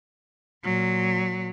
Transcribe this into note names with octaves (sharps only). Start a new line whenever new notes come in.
A#2 F#3